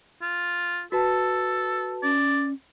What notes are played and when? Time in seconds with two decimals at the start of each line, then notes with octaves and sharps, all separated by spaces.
0.22 F4
0.92 F#4 A4 B4 A5
2.03 C#4 D5